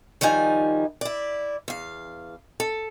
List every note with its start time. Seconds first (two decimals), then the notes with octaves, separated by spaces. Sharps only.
0.21 D#3 F3 G3 D#4 G#5
1.01 E4 D5
1.68 E2 F5
2.60 A4